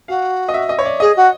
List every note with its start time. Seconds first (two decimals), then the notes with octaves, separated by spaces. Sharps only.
0.08 F#4 F5
0.49 D#5
0.54 E5
0.69 D#5
0.79 C#5
0.85 D5
1.00 G#4 D#5
1.16 F#4